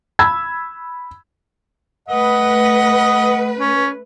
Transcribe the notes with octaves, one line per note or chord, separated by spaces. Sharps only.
B5 E6 G#6
A3 B4 D#5 F#5
C#4